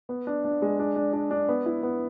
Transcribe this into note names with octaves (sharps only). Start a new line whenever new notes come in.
B3
D4
D4
G#3
D4
D4
D4
D4
B3
E4
B3